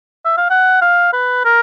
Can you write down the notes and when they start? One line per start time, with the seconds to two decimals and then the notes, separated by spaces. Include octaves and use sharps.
0.25 E5
0.37 F5
0.50 F#5
0.82 F5
1.13 B4
1.45 A#4